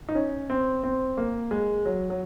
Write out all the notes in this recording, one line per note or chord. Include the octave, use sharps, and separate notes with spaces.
D#4
C#4
C4
C4
A#3
G#3
F#3
F#3